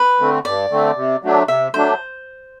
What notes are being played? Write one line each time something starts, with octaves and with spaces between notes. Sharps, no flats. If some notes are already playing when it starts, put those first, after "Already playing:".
Already playing: B4
D3 A3 C4
G2 D5
D3 A3 C4
C3
F#3 A3 D4
C3 E5
F#3 A3 D4 C5